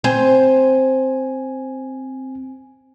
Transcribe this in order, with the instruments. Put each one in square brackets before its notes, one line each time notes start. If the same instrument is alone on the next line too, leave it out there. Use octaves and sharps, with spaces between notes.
[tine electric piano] C4 G#5 [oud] C5